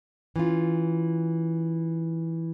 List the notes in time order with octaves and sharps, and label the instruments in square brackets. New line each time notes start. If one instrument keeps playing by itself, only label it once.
[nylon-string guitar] E3 C#4 F4